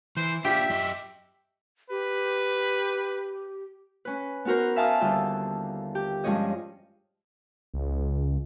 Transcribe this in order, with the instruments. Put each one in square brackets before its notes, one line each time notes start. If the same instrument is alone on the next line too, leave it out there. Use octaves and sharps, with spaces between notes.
[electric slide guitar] E3 [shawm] C5
[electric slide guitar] D4 F4 [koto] G4 [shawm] E5
[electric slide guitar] F#2 D#5
[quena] G4 [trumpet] B4
[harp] C#4 B4
B3 D#4 F#4 A#4 C5
E5 F5 G#5 A5 D#6 F6
D#2 D3 G3 F4 E6
G4
G2 F3 G#3 C#4 C#5 D#5
[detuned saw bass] C#2